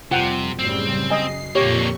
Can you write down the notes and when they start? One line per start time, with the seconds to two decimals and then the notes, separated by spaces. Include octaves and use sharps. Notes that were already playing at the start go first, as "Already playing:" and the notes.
0.11 F2 C3 G3 F4 F#5 G5
0.59 F#1 A2 C#3 G3 C4
1.10 F#2 D#5 G#5 C7
1.55 F2 A#2 D3 A#3 G4 C#5 C#6